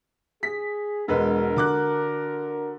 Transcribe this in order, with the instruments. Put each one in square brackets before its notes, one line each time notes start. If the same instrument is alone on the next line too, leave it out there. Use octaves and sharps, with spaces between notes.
[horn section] G#4 [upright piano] B6
[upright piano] E1 G#3 B4 [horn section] D4 F#4 A#4
[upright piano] D3 D6 F#6